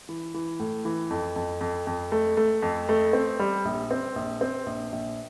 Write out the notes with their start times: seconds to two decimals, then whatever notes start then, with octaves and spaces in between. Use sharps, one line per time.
0.09 E3
0.34 E3
0.60 A2
0.85 E3
1.10 F2
1.36 F2
1.61 F2
1.87 F2
2.12 A3
2.37 A3
2.62 F2
2.89 A3
3.13 C4
3.39 G3
3.65 A#1
3.91 C4
4.16 A#1
4.41 C4
4.66 A#1
4.92 A#1